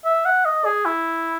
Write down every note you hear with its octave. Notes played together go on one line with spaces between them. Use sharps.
E5
F#5
D#5
G#4
E4